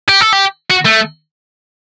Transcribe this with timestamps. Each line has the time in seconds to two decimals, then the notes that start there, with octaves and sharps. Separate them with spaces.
0.09 G4
0.21 A4
0.33 G4
0.71 F#4
0.86 A3